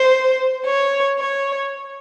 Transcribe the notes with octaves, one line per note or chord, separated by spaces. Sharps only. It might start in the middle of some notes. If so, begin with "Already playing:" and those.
Already playing: C5
C#5
C#5